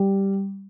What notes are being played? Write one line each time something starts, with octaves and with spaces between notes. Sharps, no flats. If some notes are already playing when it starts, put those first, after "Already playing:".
Already playing: G3